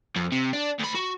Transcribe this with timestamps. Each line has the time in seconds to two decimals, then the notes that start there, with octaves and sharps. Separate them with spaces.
0.16 F2
0.32 C3
0.53 D4
0.80 D2 B5
0.95 F#4